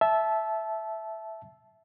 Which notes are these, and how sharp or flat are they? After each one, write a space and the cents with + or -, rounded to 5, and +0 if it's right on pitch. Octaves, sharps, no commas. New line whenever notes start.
E5 +0 A5 -20